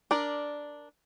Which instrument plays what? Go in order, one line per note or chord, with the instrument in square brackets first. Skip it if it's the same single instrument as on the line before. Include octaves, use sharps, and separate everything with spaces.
[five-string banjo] D4 A#4 D5